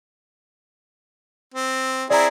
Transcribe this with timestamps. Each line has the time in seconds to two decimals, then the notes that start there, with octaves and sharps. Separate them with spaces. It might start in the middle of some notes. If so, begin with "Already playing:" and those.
1.55 C4
2.10 C4 E4 G#4 D5 A#5